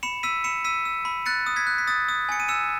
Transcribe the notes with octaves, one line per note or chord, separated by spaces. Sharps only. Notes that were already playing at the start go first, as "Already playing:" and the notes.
B5 C#7 E7
E6 B6 D#7
B5 C#7 E7
E6 B6 D#7
E6
B5
F#6 A6 C#7
D#6
G#6 B6
F#6
B6
D#6 A6
D#6
G#5 C#7
D#7
E6 C#7 E7